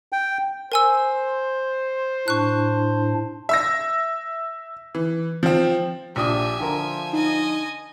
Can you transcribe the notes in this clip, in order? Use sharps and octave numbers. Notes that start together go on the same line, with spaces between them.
G5
A#4 C5 G#5 E6
A2 D4 C#6 F#6
E5 E6 A#6
E3
F3 C4
A#1 D4 G4 E5 G#5 D#6
D3 F3 A#4
D#4 D#5 G#5